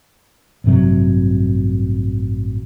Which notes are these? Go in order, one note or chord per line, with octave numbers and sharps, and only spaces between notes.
A1 G2 C3 F#3